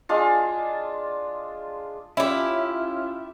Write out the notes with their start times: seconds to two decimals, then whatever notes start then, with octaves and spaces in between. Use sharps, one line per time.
0.09 G#3 D4 F4
2.17 C#4 E4 F4 G4 E5